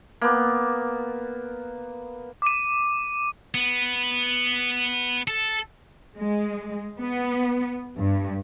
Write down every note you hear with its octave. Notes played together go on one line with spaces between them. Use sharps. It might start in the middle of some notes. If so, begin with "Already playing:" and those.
A#3 B3
D6 D#7
B3
A4
G#3
B3
G2